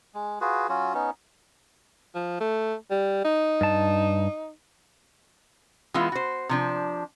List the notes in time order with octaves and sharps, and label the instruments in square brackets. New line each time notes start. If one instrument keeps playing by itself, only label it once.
[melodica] G#3
F4 F#4 G#4 B4
F#3 C#4 F4 F#4
B3 C#4 D#4
[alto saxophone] F3
A3
G3
D#4
[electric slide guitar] G2 A5
[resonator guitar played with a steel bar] E3 G#3 B3 E4 F4
F#4 C5
C3 F3 D4